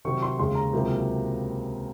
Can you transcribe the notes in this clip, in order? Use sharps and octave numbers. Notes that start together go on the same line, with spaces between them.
C3 D#3 F#3 C#6
C6
D#2 C#3 G#3 C6
A#5
C#2 C3 D#3 F#3 A#3